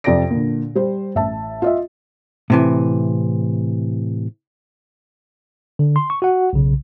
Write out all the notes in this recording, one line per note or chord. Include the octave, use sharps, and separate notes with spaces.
F2 C3 D5 G5 A#6 D7
A#2 D3
G3 C5
A1 E5 A5
F4 D#5 E5
A2 C3 E3
D3
C6
C#6
F#4 F#5
B1 C#3